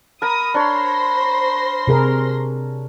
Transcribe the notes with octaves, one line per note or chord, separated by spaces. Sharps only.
A#4 A#5 B5 D#6
D4 C5 C#5 C6 A#6
C3 G#4 A#4